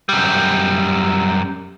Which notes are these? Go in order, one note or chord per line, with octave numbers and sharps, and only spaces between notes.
F#2 G3